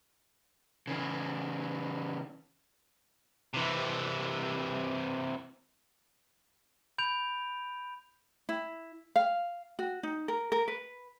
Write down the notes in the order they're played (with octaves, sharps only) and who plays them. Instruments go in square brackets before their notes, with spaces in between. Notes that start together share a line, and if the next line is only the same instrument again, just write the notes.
[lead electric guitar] C#3 E3
[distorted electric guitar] C3 E3
[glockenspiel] B5 G6 D7 F7
[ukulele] E4
F5
F#4
D#4
A#4
A#4
B4